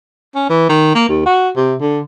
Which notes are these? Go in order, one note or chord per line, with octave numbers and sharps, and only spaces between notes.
C#4
E3
D#3
A#3
D#2
F#4
C3
D3